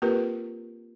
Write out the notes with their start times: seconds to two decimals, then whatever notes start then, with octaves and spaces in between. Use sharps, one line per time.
0.02 A#3 C4 F4 G4 A#4 B4